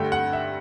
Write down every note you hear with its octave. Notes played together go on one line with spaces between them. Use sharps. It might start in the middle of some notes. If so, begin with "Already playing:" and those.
Already playing: G2 D3 A3 G5
F#5
E5